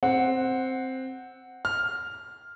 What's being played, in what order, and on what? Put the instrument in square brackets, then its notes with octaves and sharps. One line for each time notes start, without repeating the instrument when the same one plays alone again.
[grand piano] C4 [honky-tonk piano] F#5
[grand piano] F6